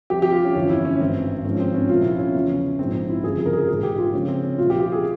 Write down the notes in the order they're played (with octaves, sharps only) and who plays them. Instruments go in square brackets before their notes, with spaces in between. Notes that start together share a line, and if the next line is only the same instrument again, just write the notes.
[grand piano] C2 C3 F3 G4
G4
F4
C#4
G1 F2 E3 C#4
E4
C#4
G#1 G2 E3 C4
G#1 G#2 F3 C#4
C4
C#4
C2 A#2 F3 F4
E4
C#4
E2 C#3 F3
A#1 G#2 F3 C4
C4
E4
G1 F2 C#3 F3 G#4
G#4
A#4
G#4
A#1 G#2 E3 G#4
G4
F4
C#2 C3 F3 C#4
C4
C#4
C2 A#2 F3 F4
G4
G4
G#4